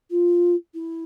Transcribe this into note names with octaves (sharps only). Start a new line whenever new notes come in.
F4
E4